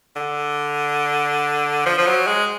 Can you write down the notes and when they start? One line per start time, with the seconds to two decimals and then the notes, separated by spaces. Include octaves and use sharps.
0.16 D3
1.86 F3
1.98 F3
2.06 F#3
2.27 G#3